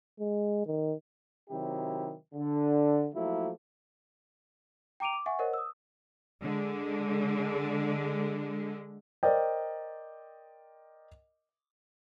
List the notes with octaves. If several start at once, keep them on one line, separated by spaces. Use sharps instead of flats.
G#3
D#3
C3 D#3 F#3 E4 G4
D3
F3 F#3 A3 A#3 E4
G5 A#5 D6 D7 D#7 F7
D6
E5 F#5 G#5 C#6
A#4 C5 C#5 D#5 F#5
D#6 E6
D3 G#3
A#4 C5 D5 D#5 G5